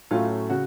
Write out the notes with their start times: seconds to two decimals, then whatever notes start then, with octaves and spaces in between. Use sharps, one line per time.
0.11 A2 F#3 A3 C#4 F4
0.50 C#3 F#4